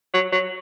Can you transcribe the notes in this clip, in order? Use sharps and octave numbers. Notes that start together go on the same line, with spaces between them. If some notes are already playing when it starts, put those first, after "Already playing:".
F#3
F#3